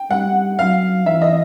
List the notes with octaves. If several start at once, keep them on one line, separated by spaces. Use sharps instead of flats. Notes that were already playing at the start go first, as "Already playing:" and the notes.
Already playing: G5
G3 F#5
F#3 F5
E3 E5
D#5